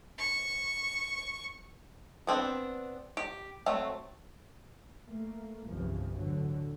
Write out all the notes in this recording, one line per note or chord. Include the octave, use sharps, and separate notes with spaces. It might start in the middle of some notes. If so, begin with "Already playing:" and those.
C#6
B3 C4 D4
G4
F#3 A3 C4
A3 A#3
G1 C2 F2 C#3 E3 F3
D2 A2 D3 F#3